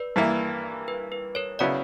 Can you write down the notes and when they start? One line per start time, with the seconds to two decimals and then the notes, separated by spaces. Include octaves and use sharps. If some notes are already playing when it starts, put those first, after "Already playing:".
Already playing: B4 D5
0.16 G2 E3 A#3 E4
0.88 B4
1.12 B4
1.35 A#4 C#5
1.59 C#3 F#3 B3 E4 D5 F#5